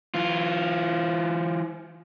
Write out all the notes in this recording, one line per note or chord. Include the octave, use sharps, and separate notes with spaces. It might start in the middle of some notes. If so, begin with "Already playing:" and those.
E3 F4